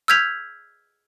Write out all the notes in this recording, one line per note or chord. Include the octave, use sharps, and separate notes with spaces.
E6 F6 G6 G#6 B6 F7